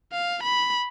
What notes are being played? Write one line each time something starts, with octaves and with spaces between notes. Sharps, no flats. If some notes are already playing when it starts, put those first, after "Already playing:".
F5
B5